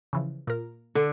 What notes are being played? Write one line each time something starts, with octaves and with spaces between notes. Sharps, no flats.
C#3 E3 F3
A#2 A#4
D3